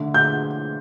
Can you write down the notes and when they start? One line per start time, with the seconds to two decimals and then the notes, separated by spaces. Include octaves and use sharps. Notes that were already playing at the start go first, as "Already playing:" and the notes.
Already playing: D3 A3
0.14 G6